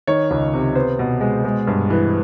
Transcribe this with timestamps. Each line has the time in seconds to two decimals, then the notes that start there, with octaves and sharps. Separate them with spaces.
0.07 D#3 C#5
0.30 C#2
0.53 C3
0.75 B3 C5
0.99 B2
1.21 G#3
1.45 G#3
1.67 G2
1.90 E3